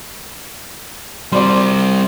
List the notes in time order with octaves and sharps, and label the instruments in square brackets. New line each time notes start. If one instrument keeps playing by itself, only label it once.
[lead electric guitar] G3 C4 [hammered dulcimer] C5 D5 D6